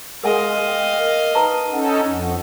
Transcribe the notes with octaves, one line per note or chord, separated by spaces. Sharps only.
G#3 A#4 D#5 F5 F#5 G#5
G5
A#4
D#4 B4 A5 A#5
C#4 D#4 A4 F#5
F2